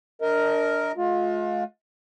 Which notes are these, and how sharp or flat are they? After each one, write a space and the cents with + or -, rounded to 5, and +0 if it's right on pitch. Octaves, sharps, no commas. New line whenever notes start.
D4 -5 A#4 +0 D#5 +35
G#3 +45 F4 +30